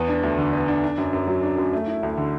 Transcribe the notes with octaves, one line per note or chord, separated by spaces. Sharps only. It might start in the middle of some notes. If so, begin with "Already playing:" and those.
Already playing: E2 B3
D4
D2
D3
B3
D4
D4
F#2
F#2
F#3
D4
F#2
A3
E4
D2
D3